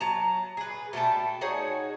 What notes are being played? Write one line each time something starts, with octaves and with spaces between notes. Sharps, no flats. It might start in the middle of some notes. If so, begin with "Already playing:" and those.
F#3 A5 A#5
G#4 B4
B2 A3 G5 A5
D#4 F#4 G#4 C#5